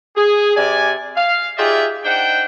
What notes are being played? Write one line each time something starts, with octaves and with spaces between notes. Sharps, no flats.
G#4
C3 D5 G#5
F5
D#4 F4 G4 G#4 D5 E5
D4 D#4 C5 F#5 G5